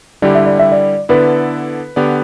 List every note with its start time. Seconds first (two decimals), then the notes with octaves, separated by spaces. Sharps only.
0.22 D3 G3 E4 G4 D5
0.35 E5
0.46 D5
0.59 E5
0.72 D5
1.09 D3 B3 E4 A4 B4 D5
1.96 D3 B3 G4 D5